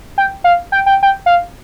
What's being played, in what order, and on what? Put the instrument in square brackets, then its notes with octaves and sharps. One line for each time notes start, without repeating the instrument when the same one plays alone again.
[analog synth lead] G5
F5
G5
G5
G5
F5